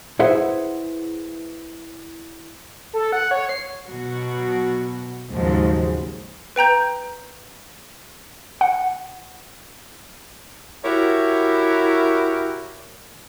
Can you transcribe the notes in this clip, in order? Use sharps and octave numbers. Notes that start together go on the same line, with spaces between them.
E4 G#4 B4 C5 E5 F#5
A4
F#5
C#5
C7
B2 F#3 F#4
D#2 G#2 C#3 F3 F#3 G#3
B4 G5 A#5 G6
F#5
E4 F#4 G4 A#4 C#5